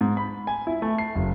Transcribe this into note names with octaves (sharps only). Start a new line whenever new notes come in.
G#2
B5
G#5
E4
A3
C7
F#1